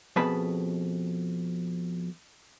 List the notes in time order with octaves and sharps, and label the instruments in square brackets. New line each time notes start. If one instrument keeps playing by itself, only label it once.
[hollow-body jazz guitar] F2 B2 G#4 B4 A5 B5